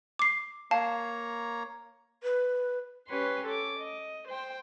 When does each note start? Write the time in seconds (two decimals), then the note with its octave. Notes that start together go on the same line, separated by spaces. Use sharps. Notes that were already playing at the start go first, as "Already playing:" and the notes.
0.19 D6 C7
0.71 A#3 C#5 F5 A5 A#5
2.23 B4
3.07 C#4 G4 B4 C#5 C6
3.44 A4 C#5 D6
3.77 D#5
4.26 C5 G5